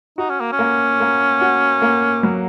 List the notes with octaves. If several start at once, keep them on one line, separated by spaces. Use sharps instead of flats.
D#4 F#4
C#4
A#3
C#4
A#3
A#3
F#4
A#3
F#3